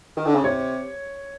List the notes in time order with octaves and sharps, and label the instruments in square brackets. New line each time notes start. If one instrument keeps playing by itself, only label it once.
[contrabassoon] D#3
D3
C#3
[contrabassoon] C3 [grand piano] C#5